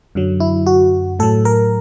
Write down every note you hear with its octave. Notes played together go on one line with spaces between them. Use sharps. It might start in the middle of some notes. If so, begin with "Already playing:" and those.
F#2 D3 F#3
E4
F#4
A2 F#3 A4
A#4